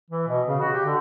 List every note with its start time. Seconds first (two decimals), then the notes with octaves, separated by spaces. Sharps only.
0.10 E3
0.28 B2
0.48 C#3
0.61 F#4
0.73 G4
0.85 D3